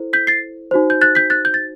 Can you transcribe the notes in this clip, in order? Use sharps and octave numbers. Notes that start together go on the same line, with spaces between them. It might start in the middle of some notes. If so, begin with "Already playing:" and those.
Already playing: E4 A4 C5
G6 B6
A6 C7
D#4 F#4 C5
G6
F#6 A6
G6 B6
F#6 A6
G6
A6